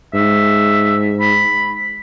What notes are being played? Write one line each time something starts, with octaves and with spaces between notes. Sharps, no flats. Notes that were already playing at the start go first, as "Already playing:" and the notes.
G#2 E5
B5